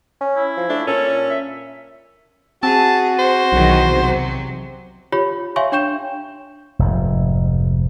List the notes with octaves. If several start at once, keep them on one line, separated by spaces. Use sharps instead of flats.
C#4
E4
F3
A3 D4
A#2 C#4 A4
E5
C4 F#4 G#4 A5
C5
B1 E2 D#3 F#3
C3 F#3
F4 G4 C#5 B5
C#5 E5 F5 G#5 C6 C#6
D4 C#5 G5 C#6 G6 E7
F1 G#2